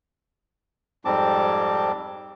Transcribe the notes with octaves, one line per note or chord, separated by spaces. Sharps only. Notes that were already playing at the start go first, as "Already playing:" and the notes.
F2 G#2 G3 C4 A5 D6